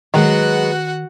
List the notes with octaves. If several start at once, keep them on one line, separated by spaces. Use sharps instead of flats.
D#3 F#3 G#3 B3 F#4 F#5